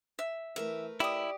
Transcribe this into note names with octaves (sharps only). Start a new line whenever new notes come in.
E5
E3 A3 A#4 B4 E5
E4 G4 D5 D#6